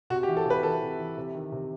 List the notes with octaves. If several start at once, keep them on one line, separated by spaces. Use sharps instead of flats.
C3 F#4
G4
E3
A4
C3 B4
E3 A4
C3
E3
C3
D#3
C3